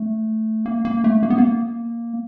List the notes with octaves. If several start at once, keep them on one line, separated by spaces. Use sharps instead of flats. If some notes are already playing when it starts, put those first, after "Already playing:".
Already playing: A3
A#3
A#3
A3
A#3
B3
A#3